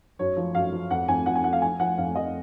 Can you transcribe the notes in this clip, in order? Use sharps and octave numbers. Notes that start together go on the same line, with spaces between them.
F#2 C#5
F3
F#2 F5
F3
F2 F#5
F2 G#5
F3 F#5
G#5
F3 F#5
F5
F3 G#5
F3 F#5
F2 F5
F3 D#5